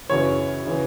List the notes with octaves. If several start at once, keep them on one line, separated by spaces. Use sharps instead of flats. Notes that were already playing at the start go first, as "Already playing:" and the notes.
F#2 C#3 E3 C#5
C#3 E3